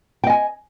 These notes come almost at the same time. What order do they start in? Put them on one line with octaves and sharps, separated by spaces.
G5 D#5 G#5